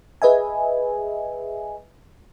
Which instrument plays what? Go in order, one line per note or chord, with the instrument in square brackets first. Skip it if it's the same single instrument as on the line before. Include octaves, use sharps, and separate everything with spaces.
[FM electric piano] G#4 B4 D#5 E5 G#5